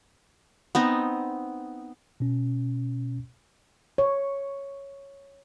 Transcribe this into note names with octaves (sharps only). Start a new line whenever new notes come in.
B3 C4 D#4
B2 C#4
C#5